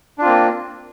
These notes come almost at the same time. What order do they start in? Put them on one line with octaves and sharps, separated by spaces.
D4 F4 C4 A#3